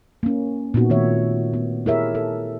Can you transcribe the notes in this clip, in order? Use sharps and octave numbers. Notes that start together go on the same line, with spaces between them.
A#3 C#4
A#2 B3 C4 D#4 F#4
D#3 A3 B3 C#5 E5
B3
E4 G4 G#4 A#4 C#5 E5
A4